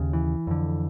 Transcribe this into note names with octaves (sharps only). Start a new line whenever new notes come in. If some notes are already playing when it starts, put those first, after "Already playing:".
Already playing: D#2 C#3
E3
F2 D3